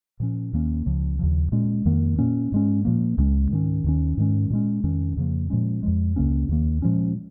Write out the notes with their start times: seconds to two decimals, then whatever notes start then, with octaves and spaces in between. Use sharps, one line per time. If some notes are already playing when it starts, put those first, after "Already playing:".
0.20 A#2 F3 C#4
0.53 D#2 D#3 A#3 C#4
0.86 C#2 C#3 F3
1.19 D#2 C#3 F3
1.52 A#2 G#3 C#4
1.85 F2 D#3 A#3
2.18 A#2 A#3 C#4
2.52 G#2 G#3 C#4
2.85 A#2 F3 A#3
3.18 C#2 C#3 G#3 C#4
3.51 G#2 D#3 C#4
3.84 D#2 D#3 C#4
4.17 G#2 D#3 G#3 C#4
4.50 A#2 G#3 C#4
4.84 F2 D#3 C#4
5.17 F2 C#3 F3 A#3
5.50 A#2 F3 G#3 C#4
5.83 F2 C#3 F3 G#3
6.16 C#2 C#3 A#3 C#4
6.49 D#2 D#3 A#3
6.82 A#2 F3 G#3 C#4